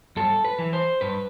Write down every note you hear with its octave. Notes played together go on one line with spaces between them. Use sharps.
G2 A4
B4
E3
C5
G2 B4